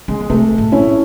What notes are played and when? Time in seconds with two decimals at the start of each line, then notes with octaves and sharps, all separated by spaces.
0.08 C#3 G#3
0.20 G#3
0.30 C3 A3
0.58 A2
0.72 C#4 E4